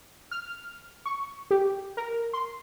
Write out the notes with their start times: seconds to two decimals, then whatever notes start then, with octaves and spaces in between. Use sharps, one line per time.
0.31 F6
1.06 C#6
1.51 G4
1.97 A#4
2.33 C6